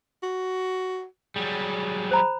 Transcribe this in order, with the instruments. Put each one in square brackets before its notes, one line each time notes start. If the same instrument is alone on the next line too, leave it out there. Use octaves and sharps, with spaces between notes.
[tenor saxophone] F#4
[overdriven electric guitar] F#3 G3 [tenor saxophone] G#4
[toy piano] C5 A#5 B5